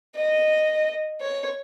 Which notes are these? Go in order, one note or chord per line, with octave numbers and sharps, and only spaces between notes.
D#5
C#5